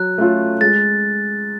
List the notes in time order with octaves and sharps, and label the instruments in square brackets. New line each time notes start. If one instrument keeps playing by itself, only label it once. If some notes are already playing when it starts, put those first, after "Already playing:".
Already playing: [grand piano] F#3 [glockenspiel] F#6
[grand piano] A3 C#4 F4 A4
[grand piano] G#3 [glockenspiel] A6